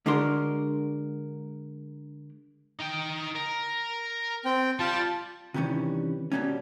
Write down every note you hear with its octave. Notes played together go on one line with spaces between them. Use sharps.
D3 G#3 D4 F#4 A#4 C6
D#4 G5
A#4
C4 G5
G3 F4 G4 A5
C3 D#3 E3 G3 C#4
B2 F#3 G3 A#3 C#4